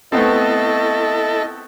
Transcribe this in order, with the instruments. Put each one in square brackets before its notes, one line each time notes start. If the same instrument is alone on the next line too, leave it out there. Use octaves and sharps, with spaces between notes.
[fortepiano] A3 B3 C4 [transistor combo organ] E4 A4 [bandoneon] D#5